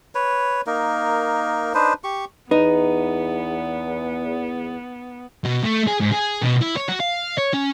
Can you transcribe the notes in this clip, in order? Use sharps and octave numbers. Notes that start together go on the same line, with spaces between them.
B4 C#5
A#3 D#4 A#4
D4 D#4 B4 C5
G4 C#6
E2 B3 D#4 B4
B2
A3
G#4
G#2
G#4
B2
E4
C#5
F#4
F5
C#5
C#4